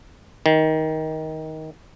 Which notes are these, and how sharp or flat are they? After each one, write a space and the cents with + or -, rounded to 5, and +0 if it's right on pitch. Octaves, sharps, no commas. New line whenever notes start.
D#3 +15